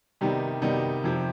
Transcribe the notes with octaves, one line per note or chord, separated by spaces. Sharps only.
C3 D#3 G3 B3 D#4
C3 D#3 G3 B3 D#4
F2 C3 F3